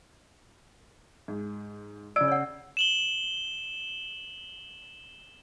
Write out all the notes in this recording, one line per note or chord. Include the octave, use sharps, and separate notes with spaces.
G#2
C#3 D5 E6 D7
C#5 F#5
E7 F#7 G7